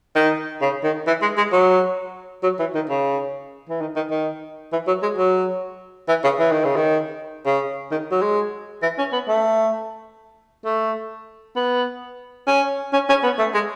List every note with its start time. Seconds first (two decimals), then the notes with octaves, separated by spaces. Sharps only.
0.15 D#3
0.61 C#3
0.84 D#3
1.07 E3
1.22 G#3
1.37 G#3
1.52 F#3
2.43 F#3
2.59 E3
2.75 D#3
2.90 C#3
3.69 E3
3.81 D#3
3.96 D#3
4.10 D#3
4.72 E3
4.87 F#3
5.02 G#3
5.18 F#3
6.08 E3
6.24 C#3
6.39 E3
6.51 D#3
6.64 C#3
6.76 D#3
7.46 C#3
7.91 D#3
8.11 F#3
8.21 G#3
8.82 E3
8.98 C#4
9.12 B3
9.28 A3
10.65 A3
11.56 B3
12.47 C#4
12.93 C#4
13.09 C#4
13.23 B3
13.38 A3
13.54 G#3